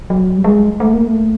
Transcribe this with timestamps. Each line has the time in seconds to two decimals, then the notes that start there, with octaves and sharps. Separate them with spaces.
0.10 F#3
0.37 G3
0.44 G#3
0.80 A3
0.93 A#3
1.07 A3